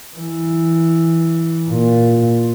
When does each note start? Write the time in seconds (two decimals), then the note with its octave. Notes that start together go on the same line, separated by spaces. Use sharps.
0.16 E3
1.69 A#2